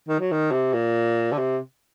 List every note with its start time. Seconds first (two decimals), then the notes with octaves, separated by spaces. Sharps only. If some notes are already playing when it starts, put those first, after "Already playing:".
0.09 D#3
0.20 F#3
0.32 D#3
0.52 C3
0.73 A#2
1.32 D3
1.38 C3